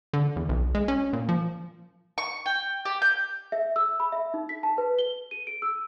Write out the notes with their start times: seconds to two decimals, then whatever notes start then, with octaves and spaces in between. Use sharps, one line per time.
0.13 D3
0.36 E2
0.49 B1
0.75 G#3
0.88 C#4
1.13 A#2
1.29 F3
2.18 C#6
2.46 G5
2.85 G4
3.02 G6
3.52 E5
3.76 E6
4.00 B5
4.12 E5
4.34 D#4
4.49 B6
4.63 A5
4.78 B4
4.99 G7
5.31 D#7
5.47 D7
5.62 E6